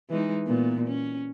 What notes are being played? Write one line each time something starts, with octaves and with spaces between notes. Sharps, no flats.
E3 G#3 D#4
A#2 B3
C#4